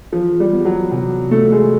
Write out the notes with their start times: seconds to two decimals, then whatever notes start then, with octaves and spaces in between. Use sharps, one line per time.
0.12 E3 F3
0.40 G3
0.53 B3
0.65 F#3
0.91 C3 F#3
1.31 C3 A3
1.52 G#3